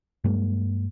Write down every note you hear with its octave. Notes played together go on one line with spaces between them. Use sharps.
G2 F#3 G#3 A#3